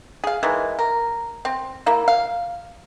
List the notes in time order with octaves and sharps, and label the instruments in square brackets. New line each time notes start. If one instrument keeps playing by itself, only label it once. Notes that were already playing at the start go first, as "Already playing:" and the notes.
[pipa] G#4 F5
D#3 E3 G#3
A#4
C4
A#3 E4
F5